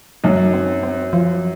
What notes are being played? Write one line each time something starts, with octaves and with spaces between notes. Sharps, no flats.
F#2 D#4
C4
C4
F3